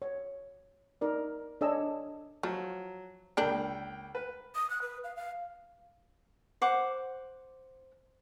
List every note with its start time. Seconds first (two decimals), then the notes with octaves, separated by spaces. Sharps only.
0.02 C#5
1.01 D#4 A#4 D5
1.61 D4 A4 C#5 D#5 G#5 E6
2.43 F3 F#3
3.37 C#2 A#3 D4 A#4 G5
4.15 B4
4.55 D#6
4.70 F#6
4.82 B4
5.04 F5
5.16 F5
6.62 C5 F#5 D6